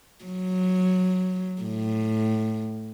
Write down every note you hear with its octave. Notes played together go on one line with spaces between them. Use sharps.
F#3
A2